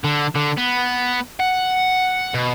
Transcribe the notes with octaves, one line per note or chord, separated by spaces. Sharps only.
D3
D3
B3
F#5
B2